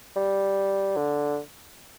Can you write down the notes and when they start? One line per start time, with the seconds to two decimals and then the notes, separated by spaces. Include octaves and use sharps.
0.16 G3
0.97 D3